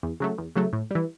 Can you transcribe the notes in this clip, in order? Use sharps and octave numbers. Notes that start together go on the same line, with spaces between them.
E2
C#3 F#3 A3
E2
C#3 F#3 A3
A2
E3 G3